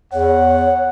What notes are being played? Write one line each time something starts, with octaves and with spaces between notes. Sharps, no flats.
E2 C#5 F#5